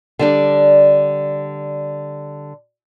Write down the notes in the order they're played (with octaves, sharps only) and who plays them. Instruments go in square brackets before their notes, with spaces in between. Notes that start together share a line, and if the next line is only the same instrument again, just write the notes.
[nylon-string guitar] D3 G3 D4